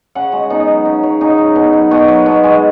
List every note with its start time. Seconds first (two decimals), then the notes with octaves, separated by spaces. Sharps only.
0.15 C#3 F#5
0.32 G#3 F#4
0.50 B2 D#4
0.67 F#3
0.85 C#3
1.03 F#3
1.21 C#3 D#4
1.38 F#3
1.56 B2
1.73 F#3
1.91 B2 F#4
2.08 F#3
2.26 B2
2.44 G#3